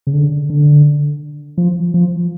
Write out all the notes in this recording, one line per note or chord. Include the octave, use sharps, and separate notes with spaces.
C#3
D3
D3
F3
F3